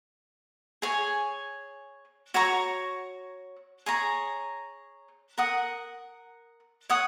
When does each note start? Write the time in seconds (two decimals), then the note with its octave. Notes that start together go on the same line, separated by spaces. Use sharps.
0.82 G#4 C#5 G#5
2.34 F#4 C#5 A#5 C#6
3.86 G#4 C#5 A#5
5.38 A#4 F#5 D#6
6.89 C#5 F#5 D#6